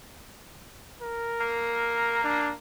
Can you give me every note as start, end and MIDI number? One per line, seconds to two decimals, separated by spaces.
1.02 2.22 70
1.40 2.53 58
2.24 2.53 62